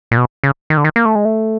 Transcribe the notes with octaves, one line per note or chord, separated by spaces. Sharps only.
A#2
B2
C#3
D#3
D3
D#3
A#3
A3
G#3
A3